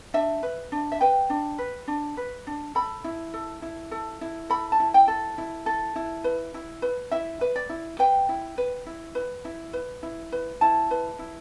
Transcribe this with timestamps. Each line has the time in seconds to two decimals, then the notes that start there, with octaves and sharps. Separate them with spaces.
0.14 D4 E5
0.43 B4
0.72 D4
0.92 E5
1.01 B4 G5
1.30 D4
1.58 B4
1.88 D4
2.17 B4
2.47 D4
2.75 A4 B5
3.04 E4
3.34 A4
3.62 E4
3.91 A4
4.21 E4
4.50 A4 B5
4.72 A5
4.80 E4
4.94 G5
5.08 A4
5.38 E4
5.66 A4
5.96 E4
6.24 B4
6.54 E4
6.82 B4
7.11 E4 E5
7.41 B4
7.56 D5
7.70 E4
7.99 B4 G5
8.29 E4
8.58 B4
8.86 E4
9.15 B4
9.45 E4
9.73 B4
10.03 E4
10.32 B4
10.61 E4 A5
10.91 B4
11.19 E4